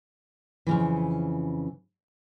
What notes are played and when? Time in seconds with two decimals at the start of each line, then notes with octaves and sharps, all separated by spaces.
0.67 F2 C#3 E3